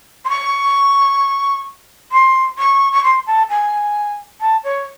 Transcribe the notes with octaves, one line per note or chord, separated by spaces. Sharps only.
C6
C#6
C6
C#6
C#6
C6
A5
G#5
A5
C#5